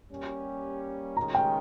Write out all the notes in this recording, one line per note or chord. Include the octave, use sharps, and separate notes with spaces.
G3 A#3 C#4 G4
D#3 G#3 C#4 A#5
G5